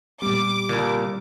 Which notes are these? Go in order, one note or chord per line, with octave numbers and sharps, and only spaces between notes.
A#2 G3 A#3 B3 D6
C2 A#2 D3